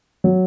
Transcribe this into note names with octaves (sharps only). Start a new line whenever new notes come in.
F#3